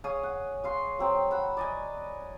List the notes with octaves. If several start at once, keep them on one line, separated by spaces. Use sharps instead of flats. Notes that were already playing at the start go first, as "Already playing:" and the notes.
G#4 C#5 F5 D#6
F#5
C#5 F5 C6
F#3 C4 G5
F#5 B5 E6
D5 D#5 G#5